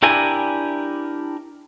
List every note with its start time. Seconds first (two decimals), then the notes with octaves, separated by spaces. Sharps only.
0.03 D4 E4 G4 A#4 G#5